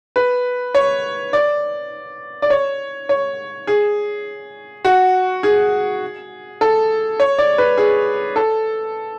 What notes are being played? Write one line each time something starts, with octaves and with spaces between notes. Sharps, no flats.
B4
C#5
D5
D5
C#5
C#5
G#4
F#4
G#4
A4
C#5
D5
B4
G#4
A4